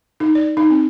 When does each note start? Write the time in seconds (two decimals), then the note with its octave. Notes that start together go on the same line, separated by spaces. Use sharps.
0.20 D#4
0.35 D5
0.57 D#4
0.70 C4